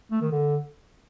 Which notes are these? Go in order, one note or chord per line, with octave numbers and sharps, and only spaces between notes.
A3
D#3
D3